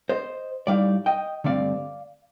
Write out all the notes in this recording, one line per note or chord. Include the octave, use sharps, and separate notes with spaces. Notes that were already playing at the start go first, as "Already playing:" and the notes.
C5 D#5
A2 G3 C4 D#4 D5 F5
D#5 G5
G2 D3 A3 C4 D5 F5